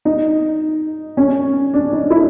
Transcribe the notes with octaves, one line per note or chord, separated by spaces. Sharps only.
D#4
C#4
D4
D#4
E4